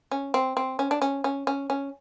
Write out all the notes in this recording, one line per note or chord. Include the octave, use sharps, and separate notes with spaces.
C#4
C4
C4
C#4
D4
C#4
C#4
C#4
C#4